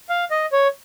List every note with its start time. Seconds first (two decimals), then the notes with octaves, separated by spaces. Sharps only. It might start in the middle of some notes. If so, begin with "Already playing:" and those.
0.09 F5
0.31 D#5
0.52 C#5